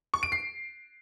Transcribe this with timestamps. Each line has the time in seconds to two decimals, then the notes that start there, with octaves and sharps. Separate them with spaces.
0.14 C#6
0.23 D7
0.32 C7